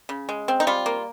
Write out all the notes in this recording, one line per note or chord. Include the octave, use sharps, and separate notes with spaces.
C#3
G#3
C4
D#4
G3 F4
A#3